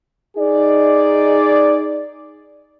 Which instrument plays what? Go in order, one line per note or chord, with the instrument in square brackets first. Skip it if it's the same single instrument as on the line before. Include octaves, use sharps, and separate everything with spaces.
[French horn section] D#4 G#4 D5